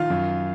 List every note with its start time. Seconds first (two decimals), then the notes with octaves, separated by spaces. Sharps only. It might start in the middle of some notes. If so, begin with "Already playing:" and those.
Already playing: D#3 F4 F5
0.10 F#2